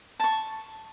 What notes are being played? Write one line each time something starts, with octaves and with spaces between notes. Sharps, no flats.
A5 C#6